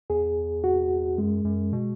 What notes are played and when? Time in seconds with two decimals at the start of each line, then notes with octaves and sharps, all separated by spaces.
0.10 E2 G#4
0.64 F#4
1.18 F#2 G#3
1.45 F#2
1.73 B2